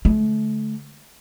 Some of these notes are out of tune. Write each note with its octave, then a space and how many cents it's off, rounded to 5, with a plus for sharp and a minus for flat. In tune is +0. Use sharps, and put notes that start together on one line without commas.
D3 -30 A3 -30